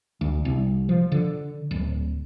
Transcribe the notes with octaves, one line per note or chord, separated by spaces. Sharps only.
D2
C2
F3
D3
D1